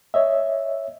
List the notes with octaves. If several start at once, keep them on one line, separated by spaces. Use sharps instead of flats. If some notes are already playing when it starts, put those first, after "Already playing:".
C#5 D#5 E5